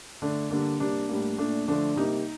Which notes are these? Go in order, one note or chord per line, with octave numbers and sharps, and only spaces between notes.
D3 A3 D4
D3 G3 A#3 D4
C3 G3 A#3 D4
A2 G3 A#3
A#2 A3 D4
D3 F3 A3 D4
C3 G3 A#3 D#4